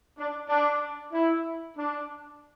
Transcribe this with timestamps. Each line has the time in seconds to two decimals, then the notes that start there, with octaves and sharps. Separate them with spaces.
0.18 D4
0.49 D4
1.13 E4
1.77 D4